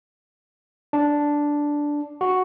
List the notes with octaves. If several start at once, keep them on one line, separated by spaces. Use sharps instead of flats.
D4
F#4